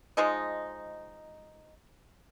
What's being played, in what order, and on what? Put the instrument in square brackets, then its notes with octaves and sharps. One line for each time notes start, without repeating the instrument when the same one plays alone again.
[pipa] F3 G#3 D#4